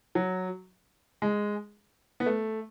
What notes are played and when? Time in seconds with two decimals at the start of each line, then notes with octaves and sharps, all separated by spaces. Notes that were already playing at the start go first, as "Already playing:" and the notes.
0.15 F#3
1.22 G#3
2.20 B3
2.26 A3